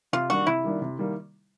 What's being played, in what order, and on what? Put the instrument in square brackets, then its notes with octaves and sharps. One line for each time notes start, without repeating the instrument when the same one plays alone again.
[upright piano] C3 [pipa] F4
[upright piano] D#3 G3 A#3 D4 [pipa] F#4
[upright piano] C3 [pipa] E4
[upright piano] D#3 G3 A#3 D4
C3
D#3 G3 A#3